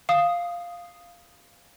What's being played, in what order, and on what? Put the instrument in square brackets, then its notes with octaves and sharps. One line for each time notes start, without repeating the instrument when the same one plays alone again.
[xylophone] F5 D#6